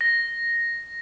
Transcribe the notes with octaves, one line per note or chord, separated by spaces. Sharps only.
A#6